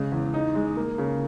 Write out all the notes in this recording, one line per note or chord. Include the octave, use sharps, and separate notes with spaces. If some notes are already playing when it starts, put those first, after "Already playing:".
Already playing: C#3 G#3
E2
D#4
G#3
A#3
C#3